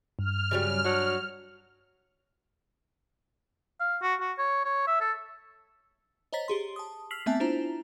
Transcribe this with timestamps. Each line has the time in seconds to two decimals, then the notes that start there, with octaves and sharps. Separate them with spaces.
0.19 G2 F6
0.51 C#3 F#3 G3
0.84 F#3 D4
3.80 F5
4.02 F#4
4.21 F#4
4.39 C#5
4.65 C#5
4.87 E5
5.01 A4
6.33 C5 C#5 D#5 A#5 A6 B6
6.48 G4 G#4 C6
6.76 A5 D#6
7.11 E6 F6 B6 C7 F7 F#7
7.26 A3 B3 C4 E5 G#5 A5
7.40 D4 E4 F4 C5 A#5